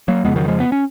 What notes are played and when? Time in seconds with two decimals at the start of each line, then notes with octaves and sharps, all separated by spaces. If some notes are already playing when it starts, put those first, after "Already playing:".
0.08 F#3 A#3
0.24 F2 C#3 G#3 B3
0.36 D#3 F#3
0.48 F3 G#3
0.60 B3
0.72 C#4